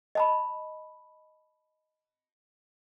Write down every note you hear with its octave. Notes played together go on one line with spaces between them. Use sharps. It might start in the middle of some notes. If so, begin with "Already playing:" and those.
D#5 A5 B5